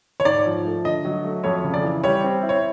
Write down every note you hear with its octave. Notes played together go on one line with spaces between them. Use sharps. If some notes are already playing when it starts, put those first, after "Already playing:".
C#5
G#2 D5
F3
A3
D3 D#5
F#3
A3
F2 C#5
C#3
D5
E3
G3 C#5
C4
E4
C#5